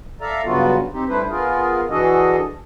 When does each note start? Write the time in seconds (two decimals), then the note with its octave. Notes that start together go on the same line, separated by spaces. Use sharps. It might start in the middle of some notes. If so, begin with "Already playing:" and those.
0.21 A4 D5 E5 F5 A#5
0.45 G2 C#3 F#3 B3 F4 F#4
0.93 C4 D#4 G4
1.09 G3 A3 D4 E4 B4 C5
1.29 B3 F4 G#4 A#4
1.90 E3 D4 F#4 G#4 A4 D#5